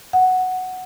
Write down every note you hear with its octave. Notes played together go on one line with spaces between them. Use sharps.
F#5